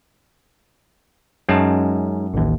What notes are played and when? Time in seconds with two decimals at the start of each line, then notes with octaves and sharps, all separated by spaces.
1.49 F#2 G#3 C#4 D#4 A5
2.34 A1 D#2